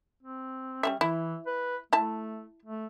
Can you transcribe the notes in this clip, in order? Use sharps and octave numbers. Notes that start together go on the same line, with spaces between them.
C4
G3 B3 C#4 E5
E3 E4
B4
A3 E4 E5 A5
A3